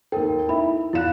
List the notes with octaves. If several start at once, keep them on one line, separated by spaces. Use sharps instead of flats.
D#2 A4 A#4 G5
D#4 E4 E5 B5
E2 E4 F5 F#6 E7